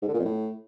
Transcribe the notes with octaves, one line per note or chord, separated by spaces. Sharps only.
G#2
D3
A#2
F2
A2